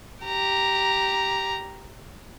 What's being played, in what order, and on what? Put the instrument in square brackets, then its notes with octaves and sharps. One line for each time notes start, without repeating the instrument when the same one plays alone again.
[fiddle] G4 A#5